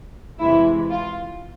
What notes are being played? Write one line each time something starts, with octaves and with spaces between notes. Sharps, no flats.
E2 C3 E3 G#3 E4
F4